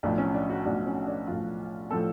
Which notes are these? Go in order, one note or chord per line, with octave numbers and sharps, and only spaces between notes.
B1 A2 F3 D4
C#4
D4
F#4
B1 A2 F3 D4
C#4
D4
B1 A2 F3 F4
A2 F3 A4